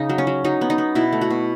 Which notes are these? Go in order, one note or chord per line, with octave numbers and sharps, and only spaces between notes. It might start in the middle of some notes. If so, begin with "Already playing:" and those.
Already playing: C#3 D#4
F#3
C#4
F#3
F#3 D#4
B3
D#4
B3
B2 E4
A3
F#4
B2